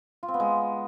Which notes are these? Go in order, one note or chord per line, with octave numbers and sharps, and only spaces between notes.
F4
C4
B3
G#3